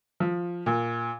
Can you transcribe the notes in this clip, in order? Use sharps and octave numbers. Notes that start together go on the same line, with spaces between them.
F3
A#2